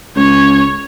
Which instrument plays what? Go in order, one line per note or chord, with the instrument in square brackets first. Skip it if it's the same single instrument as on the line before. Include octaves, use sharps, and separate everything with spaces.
[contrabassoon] C#2 [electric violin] C#5